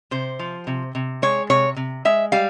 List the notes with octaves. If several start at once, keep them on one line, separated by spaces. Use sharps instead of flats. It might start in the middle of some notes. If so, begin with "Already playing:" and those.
C3 C5
F3
C3
C3
G#3 C#5
C3 C#5
C3
G#3 E5
G3 F5